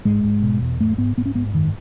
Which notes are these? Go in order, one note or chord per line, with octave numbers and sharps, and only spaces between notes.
G#2 G#3
G#2
B2
E2
G#2 A3
G#2 B3
G#2 B3
C#4
G#2 B3
F#2 D#3